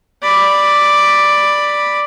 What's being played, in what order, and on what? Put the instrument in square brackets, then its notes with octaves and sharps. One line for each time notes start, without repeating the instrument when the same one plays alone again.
[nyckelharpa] D5 B5